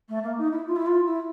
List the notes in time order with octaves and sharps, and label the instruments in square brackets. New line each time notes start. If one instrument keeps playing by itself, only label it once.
[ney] A3
A#3
D#4
E4
F4
E4
F4
E4